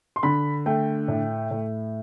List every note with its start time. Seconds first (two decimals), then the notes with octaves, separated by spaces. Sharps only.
0.16 C6
0.23 D3 B5
0.66 A3 G5
1.08 A2
1.51 A2